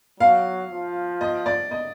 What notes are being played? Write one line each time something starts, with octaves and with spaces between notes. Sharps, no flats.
F#3 F5
F3
D#5
D5
D#5